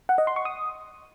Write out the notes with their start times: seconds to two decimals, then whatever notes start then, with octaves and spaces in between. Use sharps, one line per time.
0.09 F#5
0.18 D#5
0.27 C6
0.36 C#6
0.45 D#6